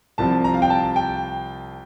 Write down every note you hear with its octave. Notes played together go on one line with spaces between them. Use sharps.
C2 C3 F3 C4 A5
A#5
F5
G5
A5
G5